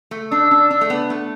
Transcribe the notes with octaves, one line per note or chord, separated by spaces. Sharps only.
A3
D4 E6
D4
D4
A3
B3
A3